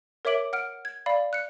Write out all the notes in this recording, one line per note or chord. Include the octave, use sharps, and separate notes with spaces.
A#4 C#5 E5 D6 D7 F#7
F#5 F6 D7
G#6
D5 F5 B5
F#6 C#7